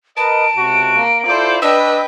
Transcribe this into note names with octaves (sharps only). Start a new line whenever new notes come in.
A#4 B4 D#5 A5 D7
C#2 C3 F#4
A#3
E4 F4 A4 C5 D5
D4 B4 D#5 G5 E6